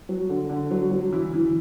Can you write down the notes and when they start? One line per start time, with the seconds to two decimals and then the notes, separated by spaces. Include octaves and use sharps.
0.09 F#3
0.29 D3
0.49 D3
0.71 F#3
0.91 F#3
1.12 E3 E4
1.33 E3